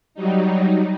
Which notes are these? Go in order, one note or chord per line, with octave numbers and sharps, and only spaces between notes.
F#3 G3 D#4